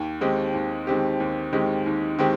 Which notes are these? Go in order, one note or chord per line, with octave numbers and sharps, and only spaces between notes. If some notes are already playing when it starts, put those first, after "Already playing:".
Already playing: D#2
D#3 G#3 C4 G4
D#2
D#3 G#3 C4 G4
D#2
D#3 G#3 C4 G4
D#2
D#3 G#3 C4 G4